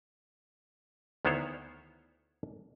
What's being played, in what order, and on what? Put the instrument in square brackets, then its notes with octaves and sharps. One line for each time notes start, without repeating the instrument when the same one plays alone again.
[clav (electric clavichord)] D2 D#3 B3 E4 C5 C#5